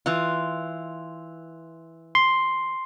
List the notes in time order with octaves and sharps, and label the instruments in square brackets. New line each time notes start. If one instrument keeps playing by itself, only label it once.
[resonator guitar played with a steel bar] E3 F4
[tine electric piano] C6